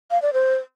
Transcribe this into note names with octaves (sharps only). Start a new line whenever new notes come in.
F5
D5
C5